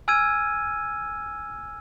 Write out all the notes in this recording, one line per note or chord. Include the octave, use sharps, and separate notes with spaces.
G#5 E6 F6 G#6 D#7